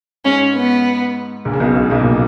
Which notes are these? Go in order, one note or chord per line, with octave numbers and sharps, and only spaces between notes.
G#2 C#4
B3
A#1 A#2
C#3
B1 B2
C#2 C#3
B1 B2
A#2